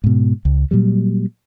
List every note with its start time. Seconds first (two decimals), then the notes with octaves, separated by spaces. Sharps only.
0.04 G#2 B2
0.45 C#2
0.71 A#2 F#3 G3